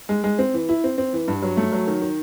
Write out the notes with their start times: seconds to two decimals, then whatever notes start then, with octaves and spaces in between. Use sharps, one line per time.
0.09 G#3
0.24 G#3
0.39 C4
0.54 E3
0.69 E4
0.84 C4
0.98 C4
1.13 E3
1.28 G2
1.42 F#3
1.57 A3
1.72 F#3
1.87 D#3
2.02 D#3